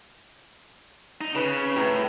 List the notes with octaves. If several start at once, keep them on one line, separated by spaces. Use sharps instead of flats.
D#4
C#3 B4
A2 A#5